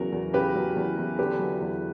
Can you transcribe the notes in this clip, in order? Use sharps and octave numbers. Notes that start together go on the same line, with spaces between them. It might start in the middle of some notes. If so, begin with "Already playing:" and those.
Already playing: E2 C#3 F#3 F#4 A#4
E2
C#3 G4 B4
F#3
E2
E2
D3 G4 B4
F#3
E2